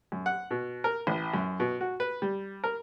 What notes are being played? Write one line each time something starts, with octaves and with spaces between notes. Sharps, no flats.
F#2
F#5
B2
A#4
A1
F#2
B2
F#4
B4
G3
A#4